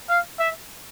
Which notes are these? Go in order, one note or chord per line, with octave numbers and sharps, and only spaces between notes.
F5
E5